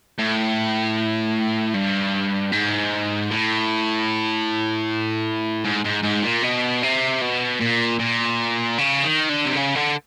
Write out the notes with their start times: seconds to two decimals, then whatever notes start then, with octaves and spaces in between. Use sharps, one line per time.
0.18 A2
1.74 G2
2.52 G#2
3.31 A2
5.65 G#2
5.85 G#2
6.04 G#2
6.24 A#2
6.43 B2
6.83 C3
7.22 B2
7.61 A#2
7.99 A#2
8.78 C#3
9.04 D#3
9.30 D3
9.46 C3
9.56 C#3
9.75 D3